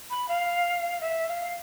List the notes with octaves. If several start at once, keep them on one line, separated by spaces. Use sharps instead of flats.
B5
F5
E5
F5